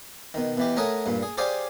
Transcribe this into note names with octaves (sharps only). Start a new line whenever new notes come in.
B2 D#3
B2 E3 G4
A3 A#4 C#5 D#5 F#5 G#5
G2 A#2
G#4
G4 G#4 C5 D5 F5 G#5